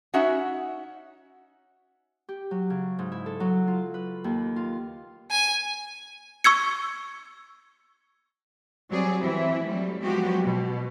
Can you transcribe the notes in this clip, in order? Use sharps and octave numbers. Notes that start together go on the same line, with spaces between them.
C#4 D#4 F#4 E5 F#5
G4
F#3
C#3
G#2
E4
A4
F#3
F4
B4
D#2
F4
G#5
C#6 E6 G#6 C#7
F#3 G3 C4 G#4 D5
E3 C4 E4
F#3 G3 A3
F3 F#3 G#3 B3 F#4 G4
B2